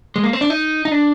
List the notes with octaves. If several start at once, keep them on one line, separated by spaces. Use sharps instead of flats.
G#3
A#3
C4
D4
D#4
D#4
D4